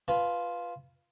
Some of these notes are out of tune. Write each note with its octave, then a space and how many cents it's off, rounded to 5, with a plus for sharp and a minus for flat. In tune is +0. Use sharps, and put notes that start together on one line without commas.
F4 +0 B4 -5 A5 -45